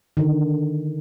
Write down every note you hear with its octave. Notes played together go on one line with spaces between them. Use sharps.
D3 D#3